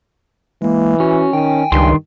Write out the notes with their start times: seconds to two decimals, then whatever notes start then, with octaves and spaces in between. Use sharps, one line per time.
0.62 E3 G#3 A#3
1.00 C#4 F#4
1.33 D#3 G5 G#5
1.72 C#2 G2 D#3 C6